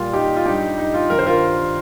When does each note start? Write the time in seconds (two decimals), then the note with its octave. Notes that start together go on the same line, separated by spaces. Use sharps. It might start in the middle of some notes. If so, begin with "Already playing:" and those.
Already playing: A#2 G3 F4
0.13 D#4 G4
0.36 F4
0.45 G2 G3 D#4 G4
0.78 D#4
0.94 F4
1.10 G2 D#3 G3 A#4
1.19 C5
1.26 F4 A#4